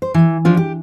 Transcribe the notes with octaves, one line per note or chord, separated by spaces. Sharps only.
C5
E3
F3 D4 F4
G4